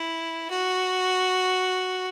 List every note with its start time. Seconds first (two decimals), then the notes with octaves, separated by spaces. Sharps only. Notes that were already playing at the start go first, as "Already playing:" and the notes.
Already playing: E4
0.50 F#4